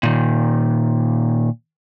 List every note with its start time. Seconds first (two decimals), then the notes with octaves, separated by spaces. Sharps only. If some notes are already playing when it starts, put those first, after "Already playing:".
0.03 A#2 D#3